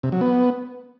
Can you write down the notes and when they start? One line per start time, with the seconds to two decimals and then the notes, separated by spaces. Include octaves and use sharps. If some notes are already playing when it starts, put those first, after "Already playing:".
0.03 C3
0.12 F#3
0.21 B3